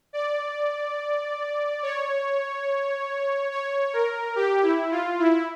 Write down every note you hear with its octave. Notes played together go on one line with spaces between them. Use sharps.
D5
C#5
C#5
A#4
G4
E4
F4
E4